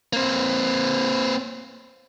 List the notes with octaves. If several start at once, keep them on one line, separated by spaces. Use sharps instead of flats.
A#3 C4